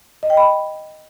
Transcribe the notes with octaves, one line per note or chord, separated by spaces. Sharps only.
D#5
G5
B5